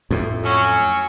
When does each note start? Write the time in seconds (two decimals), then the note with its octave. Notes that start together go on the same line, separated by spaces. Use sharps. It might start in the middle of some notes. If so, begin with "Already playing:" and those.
0.11 F2 A2
0.44 F#3 C#4